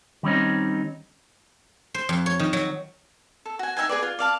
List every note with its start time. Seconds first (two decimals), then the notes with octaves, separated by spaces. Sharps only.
0.23 D#3 G3 C4 C#4 D#4
1.94 C5
2.09 F2
2.26 C#5
2.40 D#3
2.53 F#3
3.45 A4
3.59 F#4 G#5
3.77 D#4 E5 G5 G#5
3.89 G#4 B4 D5
4.03 F4
4.19 D5 F5 A5